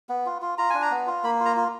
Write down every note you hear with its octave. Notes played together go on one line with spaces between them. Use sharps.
B3
F4
F4
F4 A#5
D4 G#5
A#5
B3
F4
A#3 B5
F4
A#5
F4